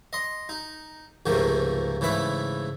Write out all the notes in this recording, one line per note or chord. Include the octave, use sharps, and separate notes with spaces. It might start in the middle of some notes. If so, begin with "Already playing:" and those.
D#5 C6
D#4
C#2 G#2 C3 F3 A3 A#3
G#2 C#3 E3 A3 B4 E5